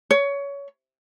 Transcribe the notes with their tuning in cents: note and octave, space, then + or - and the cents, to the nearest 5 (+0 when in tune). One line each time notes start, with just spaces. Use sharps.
C#5 +20